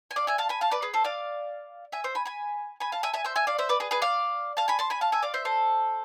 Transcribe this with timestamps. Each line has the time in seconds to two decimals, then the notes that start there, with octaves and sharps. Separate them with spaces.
0.11 G#5
0.16 D5 F5
0.27 E5 G#5
0.38 F5 A5
0.49 G#5 B5
0.61 F5 A5
0.71 B4 D5
0.82 G#4 B4
0.94 A4 C5
1.04 D5 F5
1.92 E5 G#5
2.04 C5 E5
2.15 G#5 B5
2.25 G#5 B5
2.80 G#5 B5
2.92 F5 A5
3.03 E5 G#5
3.14 E5 G#5
3.25 C5 E5
3.36 E5 G#5
3.47 D5 F5
3.59 C5 E5
3.69 B4 D5
3.80 G#4 B4
3.91 G#4 B4
4.02 D5 F5
4.57 F5 A5
4.68 G#5 B5
4.79 A5 C6
4.90 G#5 B5
5.01 F5 A5
5.12 E5 G#5
5.22 D5 F5
5.34 C5 E5
5.45 A4 C5